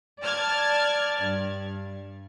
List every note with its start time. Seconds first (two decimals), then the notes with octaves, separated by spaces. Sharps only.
0.22 D5 A5 F6 G#6
1.22 G2